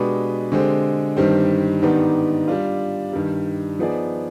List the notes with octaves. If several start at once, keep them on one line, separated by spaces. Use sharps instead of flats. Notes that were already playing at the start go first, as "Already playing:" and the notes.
Already playing: B2 G#3 D4 G4 B4
D3 G#3 C4 G4
G2 D#3 G3 C4
G#2 D#3 B3 D4 G4
G3 D4 F4
G2 D#3 G3
F3 B3 D#4 G#4 D5